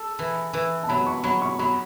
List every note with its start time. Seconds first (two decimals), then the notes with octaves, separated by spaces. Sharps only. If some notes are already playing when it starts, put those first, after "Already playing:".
Already playing: A4
0.19 E3
0.53 E3
0.83 A5
0.89 F#3 B5
1.07 C#6
1.24 F#3 B5
1.42 C#6
1.59 F#3 B5